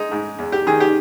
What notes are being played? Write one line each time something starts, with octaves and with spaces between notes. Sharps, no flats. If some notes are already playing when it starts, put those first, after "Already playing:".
Already playing: G#3 D#4
G#2
E2
G4
D#3 G#4
G4